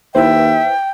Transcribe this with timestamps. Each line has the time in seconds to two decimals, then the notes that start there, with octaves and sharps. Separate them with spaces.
0.15 D#2 E4 B4 C5 E5 G5